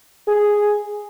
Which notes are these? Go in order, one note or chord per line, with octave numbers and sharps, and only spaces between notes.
G#4